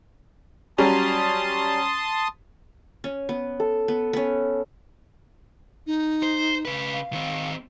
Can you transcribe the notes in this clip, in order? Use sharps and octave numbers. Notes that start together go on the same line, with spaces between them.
F#3 G3 C#4 A5 C6 D#6
C#4
B3
A4
B3
B3 C#4
D#4
C5
C#3 B4
F5
D#3 C4